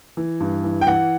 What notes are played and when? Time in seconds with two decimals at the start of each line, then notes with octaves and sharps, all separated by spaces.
0.17 E3
0.40 G2
0.64 E3
0.81 G5
0.87 E3 F#5